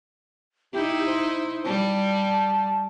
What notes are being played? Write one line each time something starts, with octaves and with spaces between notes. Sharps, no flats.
D#4 E4 G4
C5
G3 A5